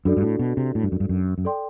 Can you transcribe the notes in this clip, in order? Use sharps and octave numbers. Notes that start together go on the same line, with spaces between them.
F#2 D4 F#4 A4 D5
G2
A2
B2
C3
A2
G2
F#2
G2
F#2
F#2
A4 D5 G5 C6